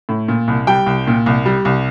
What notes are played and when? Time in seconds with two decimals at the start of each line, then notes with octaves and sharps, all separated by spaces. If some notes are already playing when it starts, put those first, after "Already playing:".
0.09 A2
0.28 A#2
0.48 C2
0.67 G3 G5
0.86 C2
1.07 A#2
1.26 C2
1.46 G3
1.65 C2